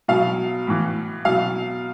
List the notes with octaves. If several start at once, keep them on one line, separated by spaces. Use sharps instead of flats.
B2 F#3 F5
A2 E3
B2 F#3 F5